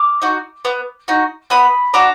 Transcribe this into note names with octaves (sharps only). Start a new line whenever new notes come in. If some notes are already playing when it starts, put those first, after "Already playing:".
Already playing: D6 F6
D#4 F#4
B3
D#4 F#4
B3 B5 D#6
D4 F#4 A#5 D6